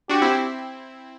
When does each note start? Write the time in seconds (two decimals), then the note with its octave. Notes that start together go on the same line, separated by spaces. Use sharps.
0.09 D4 F#4 G4
0.22 C4 E4